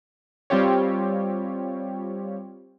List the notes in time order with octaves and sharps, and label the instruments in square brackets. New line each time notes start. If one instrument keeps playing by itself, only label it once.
[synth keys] G3 C4 F4 G4 C#5